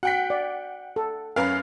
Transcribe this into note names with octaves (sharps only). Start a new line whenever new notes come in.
F#4 F#5 G5 B6
D5
A4
F#2 C#4 A#4 B4 F5